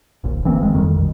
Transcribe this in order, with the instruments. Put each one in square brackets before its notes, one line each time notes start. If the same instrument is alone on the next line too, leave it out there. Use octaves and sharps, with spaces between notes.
[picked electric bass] D1 A#1
E3 A#3 C4
F1 D#3 G#3
F2 D#3 G3
A#1 B2